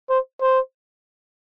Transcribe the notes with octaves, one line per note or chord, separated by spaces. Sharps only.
C5
C5